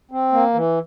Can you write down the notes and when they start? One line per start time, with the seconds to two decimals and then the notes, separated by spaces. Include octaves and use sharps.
0.11 C4
0.33 A#3
0.54 E3